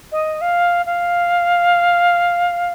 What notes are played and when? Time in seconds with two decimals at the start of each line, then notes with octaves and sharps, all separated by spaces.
0.12 D#5
0.41 F5
0.86 F5